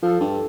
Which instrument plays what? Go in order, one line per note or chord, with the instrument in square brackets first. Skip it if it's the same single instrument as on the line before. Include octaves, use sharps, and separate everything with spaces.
[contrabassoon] F3 [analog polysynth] A4
[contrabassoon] G2